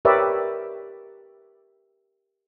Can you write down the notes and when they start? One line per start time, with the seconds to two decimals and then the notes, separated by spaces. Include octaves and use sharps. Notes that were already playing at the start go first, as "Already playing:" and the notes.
0.05 G4 A#4 B4 C#5 D5 E5